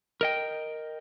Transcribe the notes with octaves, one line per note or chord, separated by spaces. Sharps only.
A#4 D#5 G5